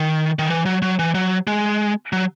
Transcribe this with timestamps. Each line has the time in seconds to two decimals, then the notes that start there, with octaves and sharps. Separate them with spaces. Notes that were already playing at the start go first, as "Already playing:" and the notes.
Already playing: D#3
0.39 D#3
0.50 E3
0.66 F#3
0.82 F#3
0.99 E3
1.14 F#3
1.47 G#3
2.13 F#3